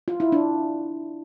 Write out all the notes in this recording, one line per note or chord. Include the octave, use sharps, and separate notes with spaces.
F4
E4
D4